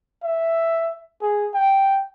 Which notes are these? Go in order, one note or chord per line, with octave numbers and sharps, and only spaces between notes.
E5
G#4
G5